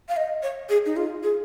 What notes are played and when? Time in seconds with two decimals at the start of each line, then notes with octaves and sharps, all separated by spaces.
0.09 F5
0.17 D#5
0.43 C#5
0.69 G#4
0.86 D#4
0.97 F4
1.23 G#4